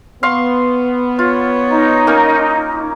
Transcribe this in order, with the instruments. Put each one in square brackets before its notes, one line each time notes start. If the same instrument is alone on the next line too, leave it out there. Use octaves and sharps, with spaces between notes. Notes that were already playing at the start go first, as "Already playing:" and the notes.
[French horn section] B3 [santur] F5 C6 C#6
[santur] F4 [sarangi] C#5
[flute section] D#4
[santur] A#3 C#4